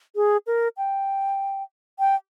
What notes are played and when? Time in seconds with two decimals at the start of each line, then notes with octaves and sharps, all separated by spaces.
0.16 G#4
0.47 A#4
0.77 G5
1.99 G5